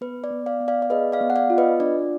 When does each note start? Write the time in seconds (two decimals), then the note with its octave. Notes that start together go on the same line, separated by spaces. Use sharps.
0.01 B3 B4
0.24 D5
0.31 B3
0.46 D5 F5
0.60 B3
0.68 D5 F5
0.82 D5
0.90 G#4 B4 D#5
1.12 D5 F5
1.21 B3
1.30 F#5
1.36 D5 F5
1.50 F4
1.58 B4 D#5
1.80 D4 D5